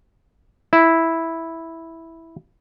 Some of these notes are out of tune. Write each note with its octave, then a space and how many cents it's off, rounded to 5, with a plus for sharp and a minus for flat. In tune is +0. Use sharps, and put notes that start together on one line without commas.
E4 -5